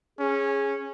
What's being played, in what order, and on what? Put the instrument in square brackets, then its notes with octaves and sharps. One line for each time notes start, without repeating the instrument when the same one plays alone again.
[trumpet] C#4 [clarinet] G#4